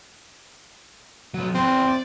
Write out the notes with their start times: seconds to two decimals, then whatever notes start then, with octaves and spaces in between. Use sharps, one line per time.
1.34 F#3 B3
1.55 E2 C4
1.88 D5